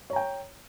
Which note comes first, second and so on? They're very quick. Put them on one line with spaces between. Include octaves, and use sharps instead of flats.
C#5 A#5 G5